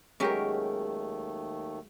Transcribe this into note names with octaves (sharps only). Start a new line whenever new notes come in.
D#2 D#3 F#3 G#3 A3 C#4 G4 A#4